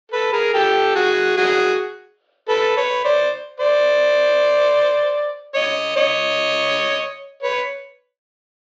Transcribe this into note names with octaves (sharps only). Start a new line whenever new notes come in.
A4 B4
G#4 A#4
G4 A4
F#4 G#4
F#4 G#4
A4 B4
B4 C#5
C5 D5
C5 D5
C#5 D#5
C#5 D#5
B4 C#5